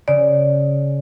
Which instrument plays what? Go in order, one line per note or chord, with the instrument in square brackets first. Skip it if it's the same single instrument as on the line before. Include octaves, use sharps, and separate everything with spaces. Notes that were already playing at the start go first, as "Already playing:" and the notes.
[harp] C#3 [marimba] D5